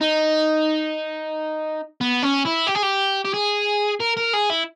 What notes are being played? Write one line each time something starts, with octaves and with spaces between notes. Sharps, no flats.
D#4
B3
C#4
E4
G4
G#4
G4
G4
G#4
A#4
A#4
G#4
E4